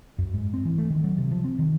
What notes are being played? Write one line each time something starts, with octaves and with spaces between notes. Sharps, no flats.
F#2
G#2
C4
E3
A3
D#3
F#3
C3
F3
C4
D#3